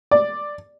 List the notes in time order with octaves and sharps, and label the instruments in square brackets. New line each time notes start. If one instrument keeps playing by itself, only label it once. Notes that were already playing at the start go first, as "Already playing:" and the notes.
[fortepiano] D5